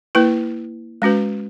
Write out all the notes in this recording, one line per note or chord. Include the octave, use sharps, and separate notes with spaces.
A#3 E4 B4
G#3 C#4 F#4 B4